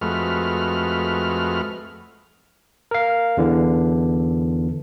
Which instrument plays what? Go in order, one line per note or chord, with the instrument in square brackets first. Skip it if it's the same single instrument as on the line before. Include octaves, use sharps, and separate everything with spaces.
[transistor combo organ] F2 G#3 A3 F#4 B4 F6
[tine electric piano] A#4 F5
E2 D3 E3